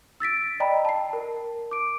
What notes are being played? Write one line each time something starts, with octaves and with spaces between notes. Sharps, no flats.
E6 A6 B6 D7
D5 D#5 G5 A#5 B5
A5 C7
A#4
D6 D7